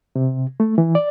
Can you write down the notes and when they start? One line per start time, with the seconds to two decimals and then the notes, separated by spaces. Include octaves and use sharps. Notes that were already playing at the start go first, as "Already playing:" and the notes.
0.16 C3
0.60 A3
0.78 E3
0.95 D5